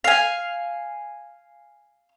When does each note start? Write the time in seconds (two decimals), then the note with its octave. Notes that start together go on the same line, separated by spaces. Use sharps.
0.04 F5 G#5